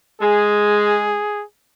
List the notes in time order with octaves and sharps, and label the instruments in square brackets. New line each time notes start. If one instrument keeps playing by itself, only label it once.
[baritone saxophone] G#3 [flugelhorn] G#4